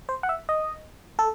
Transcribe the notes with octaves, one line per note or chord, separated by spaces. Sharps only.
C5
F#5
E5
D#5
A4